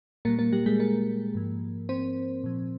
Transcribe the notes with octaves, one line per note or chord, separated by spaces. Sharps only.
A#2 G3 A#3 A#4
A#3 A#4
G3 G4
G#3 G#4
A#3 A#4
G#2 F3
C4 C5
A#2 F3